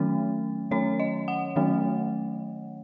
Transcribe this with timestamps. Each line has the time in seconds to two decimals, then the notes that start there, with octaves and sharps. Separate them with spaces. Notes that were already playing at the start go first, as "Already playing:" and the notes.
Already playing: D#3 F#3 A3 C#4
0.71 D#3 F#3 A3 C#4 C#5
1.00 D#5
1.28 F#5
1.56 D#3 F#3 A3 C#4